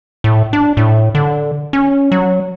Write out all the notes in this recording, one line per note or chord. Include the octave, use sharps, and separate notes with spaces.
A2
D4
A2
D3
C#4
F#3